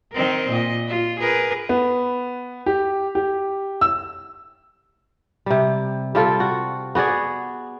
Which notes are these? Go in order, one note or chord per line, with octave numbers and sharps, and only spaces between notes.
D#3 C4 A#4
A#2 D#5
F4
G#4 A#4 B4
B3
G4
G4
E6
C3 G3
G3 C4 F4 A4
F#4
B3 F#4 G#4 D5